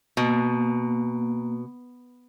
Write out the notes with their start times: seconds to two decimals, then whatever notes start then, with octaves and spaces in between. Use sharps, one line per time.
0.17 B2 A#3